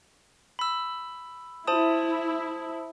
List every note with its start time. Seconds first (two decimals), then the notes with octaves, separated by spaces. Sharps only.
0.59 B5 E6
1.67 E4 C5 A5 D#6